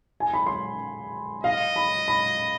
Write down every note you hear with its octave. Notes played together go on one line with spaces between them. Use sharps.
G#5
B5
C6
D#5 F5
B5
B5